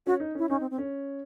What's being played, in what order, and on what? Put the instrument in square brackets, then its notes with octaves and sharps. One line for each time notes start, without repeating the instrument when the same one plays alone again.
[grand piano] C#4 [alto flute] F#4
[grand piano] D#4
[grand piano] C#4 [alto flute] E4
[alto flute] C#4 [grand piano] D#4
[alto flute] C4
C4
[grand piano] C#4